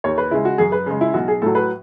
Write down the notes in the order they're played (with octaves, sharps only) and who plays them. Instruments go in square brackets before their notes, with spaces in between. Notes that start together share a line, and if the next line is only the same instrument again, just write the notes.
[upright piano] D#2 C#5
B4
C#3 G#3 E4
F#4
F#2 G#4
B4
C#3 G#3
E4
B1 F#4
G#4
A2 F#3 A4
B4